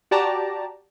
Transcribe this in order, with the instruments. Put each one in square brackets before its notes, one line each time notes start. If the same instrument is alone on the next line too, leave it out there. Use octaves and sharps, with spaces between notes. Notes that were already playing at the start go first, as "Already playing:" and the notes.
[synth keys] F#4 G4 D5 A5 A#5